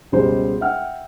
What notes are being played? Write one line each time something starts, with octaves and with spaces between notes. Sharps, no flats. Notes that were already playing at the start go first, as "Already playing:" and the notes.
C#2 B2 G3 G#3 C5
E5 F#5 G5 F6